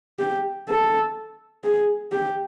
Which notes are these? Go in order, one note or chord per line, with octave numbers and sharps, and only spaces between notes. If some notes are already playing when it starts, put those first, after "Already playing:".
G4
A4
G#4
G4